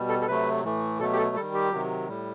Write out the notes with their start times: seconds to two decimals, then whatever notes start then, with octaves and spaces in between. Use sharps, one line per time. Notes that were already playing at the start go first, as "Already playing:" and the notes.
Already playing: B2 G3
0.09 A4
0.21 A4
0.28 C3 F#3 A3 B4
0.64 A2 E3 A3
1.00 B2 F#3 A3 A4
1.13 G4
1.18 A4
1.36 D#3 G3 A4
1.54 G4
1.72 C3 D#3 F#3
2.08 A2 G3